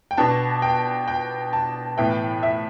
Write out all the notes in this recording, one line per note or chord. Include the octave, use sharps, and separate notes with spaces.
G5
B2 B3 D4 A5
G5
G5
A5
A2 E3 B3 E4 G5
E5